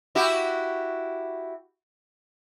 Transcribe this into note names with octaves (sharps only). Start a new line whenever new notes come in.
E4 F#4 G4